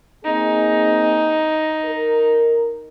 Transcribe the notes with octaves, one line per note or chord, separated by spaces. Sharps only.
A#3 C4 D#4 G#4
A#4